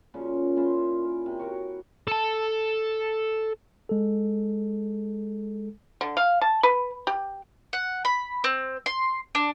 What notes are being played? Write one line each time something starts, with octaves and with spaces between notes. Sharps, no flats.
A#2 C#3 F3
C#4 E4 F4 C5
A#4
C3
F#4 A#4 C#5
A4 A5
G#3 A4
D3
F5
A5
B4
G4
F#5
B5
C4
C6
D4